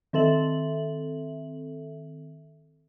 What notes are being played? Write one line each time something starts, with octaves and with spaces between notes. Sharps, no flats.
D#3 C4 A4 E5 F#7